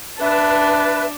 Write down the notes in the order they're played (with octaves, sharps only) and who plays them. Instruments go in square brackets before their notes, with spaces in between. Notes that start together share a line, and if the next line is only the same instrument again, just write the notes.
[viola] D4 [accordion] B4 [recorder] E5 [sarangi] A5